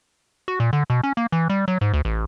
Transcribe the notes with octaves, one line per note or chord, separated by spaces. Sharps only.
F#4
A#2
D3
B2
C#4
A#3
E3
G3
F#3
G#2
D2
A1